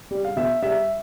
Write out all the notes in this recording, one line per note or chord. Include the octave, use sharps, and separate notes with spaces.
G3
F5
B2 E5
G3 E5